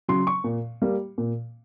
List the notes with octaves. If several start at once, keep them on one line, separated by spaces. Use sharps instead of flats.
C#3 F#3 C6
C#6
A#2
G3 A#3
A#2